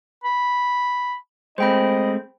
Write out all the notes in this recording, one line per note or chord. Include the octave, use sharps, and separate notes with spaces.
B5
G#3 A3 C4 C5 D#5 G5 B5